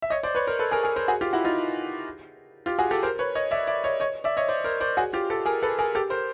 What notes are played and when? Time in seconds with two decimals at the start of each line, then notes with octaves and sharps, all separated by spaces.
0.02 E5
0.10 C#5 D#5
0.23 C5 D5
0.35 B4 C#5
0.47 A#4 C5
0.59 A4 B4
0.71 G#4 A#4
0.83 G#4 A#4
0.96 A#4 C5
1.08 F#4 G#4
1.21 F4 G4
1.33 E4 F#4
1.44 D#4 F4
2.66 F4 G4
2.79 F#4 G#4
2.91 G4 A4
3.03 A#4 C5
3.19 B4 C#5
3.35 C#5 D#5
3.51 D5 E5
3.67 D5 E5
3.84 C#5 D#5
4.00 C#5 D#5
4.24 D5 E5
4.37 C#5 D#5
4.48 C5 D5
4.64 A#4 C5
4.81 C5 D5
4.97 F#4 G#4
5.13 F4 G4
5.30 G4 A4
5.46 G#4 A#4
5.62 A4 B4
5.79 G#4 A#4
5.95 G4 A4
6.10 A#4 C5